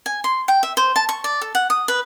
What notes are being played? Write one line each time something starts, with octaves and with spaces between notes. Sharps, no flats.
G#5
C6
G5
E5
C5
A5
C#6
D5
A4
F#5
D#6
B4